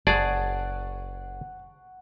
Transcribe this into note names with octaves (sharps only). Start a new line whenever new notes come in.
F#1 G#4 D5 F#5 A5 C#6